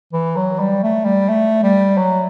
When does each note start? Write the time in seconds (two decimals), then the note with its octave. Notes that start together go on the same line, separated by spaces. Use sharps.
0.13 E3
0.36 F#3
0.60 G3
0.83 A3
1.05 G3
1.29 A3
1.63 G3
1.98 F#3